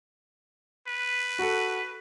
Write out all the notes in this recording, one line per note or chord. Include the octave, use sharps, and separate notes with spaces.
B4
F#4 A4